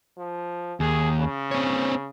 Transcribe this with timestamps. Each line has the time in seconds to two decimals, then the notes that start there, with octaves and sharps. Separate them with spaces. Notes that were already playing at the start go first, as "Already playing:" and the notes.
0.17 F3
0.80 D#2 G#4
1.19 C#3
1.51 C4 C#5